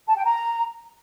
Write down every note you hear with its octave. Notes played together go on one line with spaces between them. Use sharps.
A5
G5
A#5